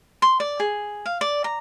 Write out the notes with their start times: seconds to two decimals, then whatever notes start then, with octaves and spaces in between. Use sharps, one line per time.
0.22 C6
0.40 D5
0.60 G#4
1.06 F5
1.21 D5
1.44 A#5